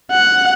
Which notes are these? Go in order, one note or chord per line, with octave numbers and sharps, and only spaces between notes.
F#5